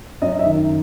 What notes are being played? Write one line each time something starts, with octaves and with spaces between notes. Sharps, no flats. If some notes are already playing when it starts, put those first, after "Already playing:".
F#2 D#5
E5
D#3